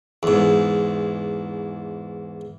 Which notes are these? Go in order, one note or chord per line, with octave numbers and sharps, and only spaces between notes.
E2 G#2